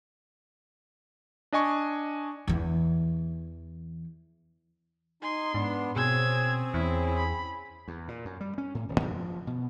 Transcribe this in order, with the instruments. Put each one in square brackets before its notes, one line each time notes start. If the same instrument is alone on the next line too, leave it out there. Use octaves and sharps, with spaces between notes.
[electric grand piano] D4 D#5 G#5 C#6
[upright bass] E2 E3
[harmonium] D#4 G#5 [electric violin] C6
[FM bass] G#2 [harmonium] B3 D4
[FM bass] B2 [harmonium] C4 C#4 G#4 [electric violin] E6 G#6
[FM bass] E2 [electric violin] E4
[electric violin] B5
[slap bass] E2
A#2
F#2
G3
C#4
A2
D#1
F2
F3
B2